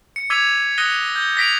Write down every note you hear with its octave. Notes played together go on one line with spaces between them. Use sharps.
C#7
D6 E6 G#6 B6 D#7 F7
D#6 F#6 A#6 C#7 D#7 G7
G6 G7
A#6 B6 D7 F7